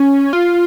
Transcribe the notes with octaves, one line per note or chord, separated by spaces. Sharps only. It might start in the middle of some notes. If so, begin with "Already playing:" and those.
Already playing: C#4
F4